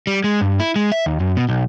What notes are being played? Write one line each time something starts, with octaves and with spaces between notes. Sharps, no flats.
G3
G#3
G2
E4
G#3
E5
D#2
F#2
B2
B1